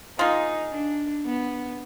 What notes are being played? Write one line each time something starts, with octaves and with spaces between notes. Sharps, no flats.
A#3 D#4 F4 G#4
D4
B3